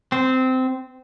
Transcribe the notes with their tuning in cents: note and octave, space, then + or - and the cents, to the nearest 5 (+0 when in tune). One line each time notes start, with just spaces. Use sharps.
C4 -15